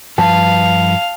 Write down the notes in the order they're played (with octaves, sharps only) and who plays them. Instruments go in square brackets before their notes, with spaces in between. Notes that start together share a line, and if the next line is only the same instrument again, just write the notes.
[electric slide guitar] G2 F3 B4 [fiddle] F5 [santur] A5